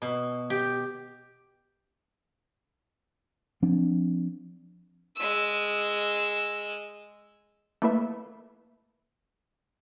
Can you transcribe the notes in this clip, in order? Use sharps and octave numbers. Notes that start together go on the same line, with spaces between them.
B2
G4
F3 C4 D4
G#3 E6
A3 A#3 E4 B4 E5